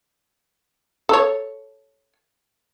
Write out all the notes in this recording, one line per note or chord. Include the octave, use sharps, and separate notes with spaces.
A4 C#5